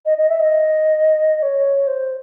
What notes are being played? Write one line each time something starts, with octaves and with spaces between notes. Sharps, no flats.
D#5
D#5
E5
D#5
C#5
C5